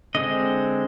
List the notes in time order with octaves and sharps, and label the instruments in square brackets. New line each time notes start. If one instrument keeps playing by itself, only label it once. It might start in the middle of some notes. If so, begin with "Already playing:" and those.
[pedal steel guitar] D3 G#3 C4 D#5